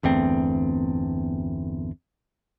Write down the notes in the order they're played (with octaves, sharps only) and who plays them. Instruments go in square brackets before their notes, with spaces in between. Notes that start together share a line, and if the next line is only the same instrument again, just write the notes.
[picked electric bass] G1 E2 A3 C4